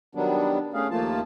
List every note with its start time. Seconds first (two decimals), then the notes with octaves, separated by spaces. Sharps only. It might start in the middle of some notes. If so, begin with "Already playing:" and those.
0.15 D#3 F#3 G3 B3 D4
0.74 A3 C#4 G#4 F5
0.91 D#2 F3 A3 A#3 F4 A5